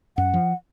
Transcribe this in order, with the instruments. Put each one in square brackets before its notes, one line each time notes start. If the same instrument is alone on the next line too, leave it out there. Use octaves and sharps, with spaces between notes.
[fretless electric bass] F#2 [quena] F#5
[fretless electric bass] F3